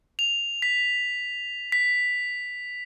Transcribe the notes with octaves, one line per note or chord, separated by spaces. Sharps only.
F7
B6
B6